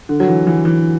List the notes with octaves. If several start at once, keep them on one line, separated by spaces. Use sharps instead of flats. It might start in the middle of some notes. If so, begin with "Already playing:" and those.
D3
F#3
E3
E3
E3